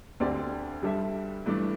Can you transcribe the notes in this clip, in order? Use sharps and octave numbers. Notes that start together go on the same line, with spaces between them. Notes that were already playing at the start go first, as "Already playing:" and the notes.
D2 D3 C4 G4 D5
G2 G3 D4 A4 E5
G2 E3 A3 D4